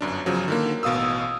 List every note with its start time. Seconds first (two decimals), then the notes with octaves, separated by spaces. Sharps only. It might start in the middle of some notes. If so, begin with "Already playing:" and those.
0.01 G1 F#2 D4
0.26 G1 C#3 F3 F#3
0.48 D3 D#3 A#3
0.83 A1 B2 F5 D#6 E6